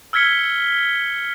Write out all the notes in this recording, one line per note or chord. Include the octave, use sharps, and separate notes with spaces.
E6 F6 G#6 B6 C#7 G7